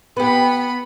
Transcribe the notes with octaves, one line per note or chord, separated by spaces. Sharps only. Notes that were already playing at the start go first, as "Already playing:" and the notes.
B3 G4 B4 B5